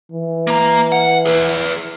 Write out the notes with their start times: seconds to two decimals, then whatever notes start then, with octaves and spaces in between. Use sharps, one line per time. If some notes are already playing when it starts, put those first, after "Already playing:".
0.11 E3
0.47 A#3 A#5
0.92 F#5
1.26 G#4 B4